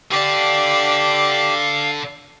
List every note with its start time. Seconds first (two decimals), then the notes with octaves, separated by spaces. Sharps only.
0.11 D3 D4 G4 D5 F5